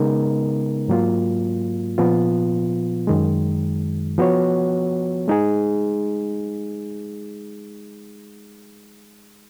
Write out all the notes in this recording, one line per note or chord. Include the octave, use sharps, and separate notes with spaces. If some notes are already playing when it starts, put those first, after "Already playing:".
Already playing: C#3 G#3 B3 D#4 A#4
G#2 F#3 A#3 F4
A#2 F3 B3 F4
F#2 D#3 G#3
F3 B3 F#4 C#5
G#3 D#4 G#4